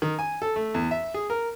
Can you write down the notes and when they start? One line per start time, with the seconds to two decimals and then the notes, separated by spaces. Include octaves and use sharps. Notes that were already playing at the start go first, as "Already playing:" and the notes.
0.02 D#3
0.19 G#5
0.42 A4
0.56 A3
0.74 E2
0.91 E5
1.14 G#4
1.30 A#4